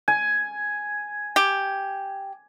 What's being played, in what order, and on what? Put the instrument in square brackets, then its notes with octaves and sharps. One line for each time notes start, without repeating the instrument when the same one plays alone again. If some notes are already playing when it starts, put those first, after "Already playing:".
[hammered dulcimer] G#5
[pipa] G4